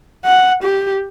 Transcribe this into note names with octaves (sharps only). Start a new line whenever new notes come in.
F#5
G4